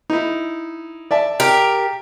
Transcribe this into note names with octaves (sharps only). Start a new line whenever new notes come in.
D#4 E4
D5 E5 A5
G4 A#4